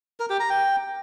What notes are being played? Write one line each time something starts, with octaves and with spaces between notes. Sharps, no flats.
A#4
G4
A#5
G5